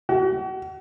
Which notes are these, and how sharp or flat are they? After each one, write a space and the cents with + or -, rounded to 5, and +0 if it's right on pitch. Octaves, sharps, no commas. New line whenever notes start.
F#4 +40